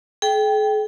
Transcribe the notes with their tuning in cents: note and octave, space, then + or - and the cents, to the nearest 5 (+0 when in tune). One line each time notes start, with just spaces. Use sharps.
G#4 +45 G5 +0